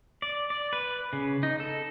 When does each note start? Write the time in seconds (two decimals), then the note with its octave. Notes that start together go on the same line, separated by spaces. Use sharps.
0.22 D5
0.50 D5
0.73 B4
1.13 C#3
1.43 D#4
1.60 A4